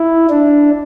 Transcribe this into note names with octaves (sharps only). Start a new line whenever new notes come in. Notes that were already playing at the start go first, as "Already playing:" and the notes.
Already playing: E4
D4